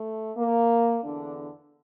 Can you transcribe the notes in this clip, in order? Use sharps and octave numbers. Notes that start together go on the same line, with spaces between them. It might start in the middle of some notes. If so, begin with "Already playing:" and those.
Already playing: A3
A#3
E2 D3 D4